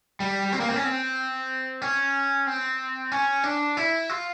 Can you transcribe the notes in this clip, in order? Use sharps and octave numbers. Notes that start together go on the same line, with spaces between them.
G3
C4
A#3
C4
C#4
C4
C#4
C4
C#4
D4
E4
F4